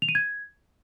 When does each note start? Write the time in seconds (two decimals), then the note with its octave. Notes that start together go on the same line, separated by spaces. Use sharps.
0.02 F7
0.09 D#7
0.15 G#6